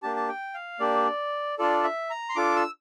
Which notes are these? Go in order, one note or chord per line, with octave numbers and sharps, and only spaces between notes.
A#3 D4 G4 A5
A5
G5
F5
A#3 D4 G4 D5
D4 F4 A4 D5
E5
A#5
C6
D4 F4 A4 D6
E6